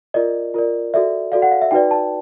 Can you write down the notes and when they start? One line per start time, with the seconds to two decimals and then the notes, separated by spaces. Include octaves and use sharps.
0.14 F4 A#4 D5 D#5
0.54 F4 A#4 D5
0.94 F#4 A4 D5 E5
1.32 F#4 A4 D5 F5
1.42 F#5
1.51 F5
1.61 E5
1.71 D#4 F#4 B4 D5 G5
1.91 A5